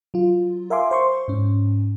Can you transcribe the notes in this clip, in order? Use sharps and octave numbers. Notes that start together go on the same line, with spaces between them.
F#3 F4
A#4 E5 F5 G#5 C6 D6
C5 C6 C#6
G#2 C#4